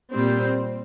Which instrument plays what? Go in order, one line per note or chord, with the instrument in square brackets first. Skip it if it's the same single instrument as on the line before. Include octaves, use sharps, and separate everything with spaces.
[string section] A#2 G3 C4